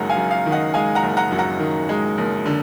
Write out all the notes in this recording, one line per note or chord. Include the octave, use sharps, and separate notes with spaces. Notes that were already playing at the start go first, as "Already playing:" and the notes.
Already playing: F#1 F#2 D#3 G#3 F#5 A#5
F5 G#5
F#2
F5
D#3
D#5 F#5
G#3 F5 G#5
F#5 A#5
F#1
F#5 A#5
F#2
F#5 A#5
D#3
G#3
F#1
D3